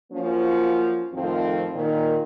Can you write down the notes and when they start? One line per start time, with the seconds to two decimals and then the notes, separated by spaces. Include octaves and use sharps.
0.11 F3 F#3 A#3 C#4
1.13 F2 A2 D#3 F3 C4
1.73 A#2 D#3